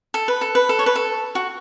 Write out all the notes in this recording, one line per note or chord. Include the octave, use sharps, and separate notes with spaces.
A4
B4
A4
B4
A4
C#5
B4
A4
F#4